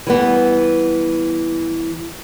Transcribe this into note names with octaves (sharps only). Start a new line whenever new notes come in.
E3 G3 B3